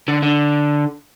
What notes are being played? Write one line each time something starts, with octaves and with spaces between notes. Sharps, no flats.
D3
D3